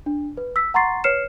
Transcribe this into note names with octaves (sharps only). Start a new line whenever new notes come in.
D4
B4
E6 B6
F#5 A#5 C6 C#6 A6 C7
B4 C#5 F6 C7 C#7 E7